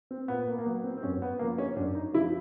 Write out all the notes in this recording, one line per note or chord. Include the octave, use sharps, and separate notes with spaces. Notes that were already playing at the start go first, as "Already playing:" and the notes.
C4
A#2 B3
A#3
A#3
F#3 B3
C4
C4
F#2 C#4
B3
C#3 F3 A#3
C#4
F#2 D4
D#4
C#3 F3 E4